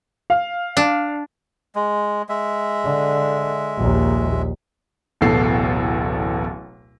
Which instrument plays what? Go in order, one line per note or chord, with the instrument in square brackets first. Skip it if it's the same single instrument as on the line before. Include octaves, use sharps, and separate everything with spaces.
[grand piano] F5
[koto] D4
[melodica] G#3
G#3 E5
[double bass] D3
A#1 D#2
[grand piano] D1 A1 B2 A4 C7